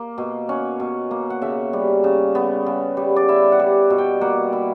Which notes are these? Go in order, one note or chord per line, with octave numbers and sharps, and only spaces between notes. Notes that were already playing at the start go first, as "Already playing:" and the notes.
Already playing: A#3
B2
C#4 F#5
B2
A#3
F#5
C#3 E5
G3
C#3
B3
C#3
G3
D5
E4 E5
F#5
G3
B2
G5
A#3 F#5
E4